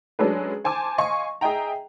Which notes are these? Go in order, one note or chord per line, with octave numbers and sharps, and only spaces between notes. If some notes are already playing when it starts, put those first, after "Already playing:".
F#3 G#3 C#4 D4 A4 B4
C5 G#5 A5 D6
D#5 F5 G#5 C6 C#6
G#4 D#5 E5 G5 A#5